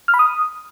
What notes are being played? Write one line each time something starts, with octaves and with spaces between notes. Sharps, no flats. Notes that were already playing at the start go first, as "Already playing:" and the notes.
F6
B5
D#6